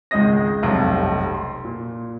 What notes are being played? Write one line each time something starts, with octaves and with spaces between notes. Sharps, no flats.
G#1 C#2 G#3 D#5 D#6 A#6
F1 B1 G2 C3 F5
C6
A#2